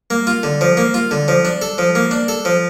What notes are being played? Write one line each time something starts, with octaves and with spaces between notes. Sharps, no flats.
A#3
F4
D3
F3
A#3
F4
D3
F3
D4
A4
F3
A#3
D4
A4
F3